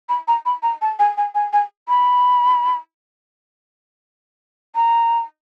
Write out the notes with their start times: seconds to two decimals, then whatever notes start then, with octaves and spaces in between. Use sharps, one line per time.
0.09 B5
0.28 A#5
0.46 B5
0.63 A#5
0.82 A5
0.99 G#5
1.17 G#5
1.35 G#5
1.53 G#5
1.89 B5
4.75 A#5